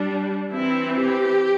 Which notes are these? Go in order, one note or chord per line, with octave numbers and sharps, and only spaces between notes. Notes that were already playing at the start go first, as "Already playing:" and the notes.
Already playing: G3 D4
E3 C4 E4
G4